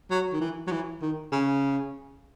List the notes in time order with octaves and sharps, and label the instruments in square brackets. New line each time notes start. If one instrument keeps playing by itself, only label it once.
[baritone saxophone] F#3
D#3
E3
F#3
E3
D#3
C#3